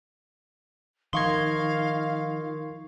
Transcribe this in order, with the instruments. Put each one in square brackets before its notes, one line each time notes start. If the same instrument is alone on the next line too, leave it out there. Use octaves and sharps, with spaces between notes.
[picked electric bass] D#3 F3 [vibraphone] D#4 A#4 [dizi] F5 [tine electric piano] C6 C#6 G#6